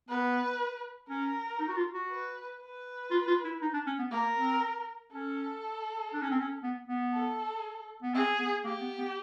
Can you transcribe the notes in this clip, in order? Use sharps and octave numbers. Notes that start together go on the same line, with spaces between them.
B3 B4
C#4 A#4
D#4
F#4
F4
F#4
B4
B4
F4
F4
E4
D#4
D4
C#4
B3
A#3 A#4
C4
C#4 A4
D4
C#4
C4
C#4
B3
B3
A4
B3
C4 G#4
B3
A#3 G4
B3
B3